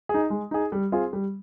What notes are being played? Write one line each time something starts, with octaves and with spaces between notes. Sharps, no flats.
D#4 G#4
G#3
D#4 G#4
G3
C4 F4 G#4
G3